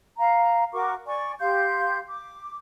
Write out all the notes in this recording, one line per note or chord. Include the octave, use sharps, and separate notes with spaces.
F5 A#5
F#4 A#4 C#6 D6
D5 G#5 C#6
G4 F5 C6 G6
D6